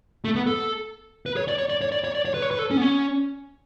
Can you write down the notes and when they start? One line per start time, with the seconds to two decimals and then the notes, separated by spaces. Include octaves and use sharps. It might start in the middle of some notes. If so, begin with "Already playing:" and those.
0.25 A3
0.36 B3
0.47 A4
1.26 B4
1.37 C#5
1.48 D5
1.58 C#5
1.69 D5
1.81 C#5
1.92 D5
2.04 C#5
2.15 D5
2.25 C#5
2.34 B4
2.42 C#5
2.51 B4
2.59 A4
2.71 C#4
2.77 B3
2.82 C#4